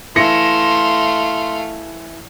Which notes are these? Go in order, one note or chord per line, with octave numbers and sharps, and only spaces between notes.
E3 A3 F5 C6 A#6 C#7